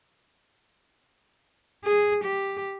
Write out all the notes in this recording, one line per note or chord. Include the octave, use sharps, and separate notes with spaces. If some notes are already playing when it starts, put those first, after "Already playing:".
G#4
G4